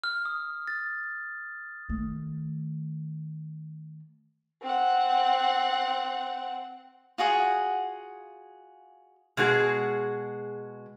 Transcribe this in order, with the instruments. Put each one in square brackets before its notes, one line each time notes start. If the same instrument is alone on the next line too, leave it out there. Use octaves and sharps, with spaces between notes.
[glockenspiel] F6
D#6
A6
[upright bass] D#3 A3
[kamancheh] C4 F#5
[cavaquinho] F4 F#4 G#4 F#5
[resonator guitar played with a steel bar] B2 G#3 F#4 G#4